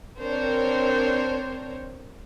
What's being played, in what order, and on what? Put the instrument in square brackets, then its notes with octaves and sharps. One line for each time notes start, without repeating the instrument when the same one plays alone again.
[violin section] C4 D4 A#4 C5 C#5